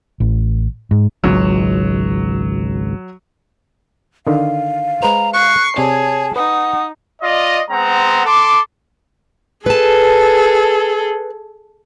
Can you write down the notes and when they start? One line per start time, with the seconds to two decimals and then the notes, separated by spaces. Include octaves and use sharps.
0.20 A1
0.91 G#2
1.24 G#1 C#2 F#3
4.27 D3 D#3 F5
5.02 G#3 B4 C5 A#5
5.33 C#6 F#6 C7
5.77 C3 G#4 C#5 D5 A5
6.36 D#4 B4 F#5 D#6
7.22 F4 D5 D#5
7.70 G#3 B3 C4 F#5 A#5
8.26 A4 C6 D6
9.66 G#4 A4 B4 A5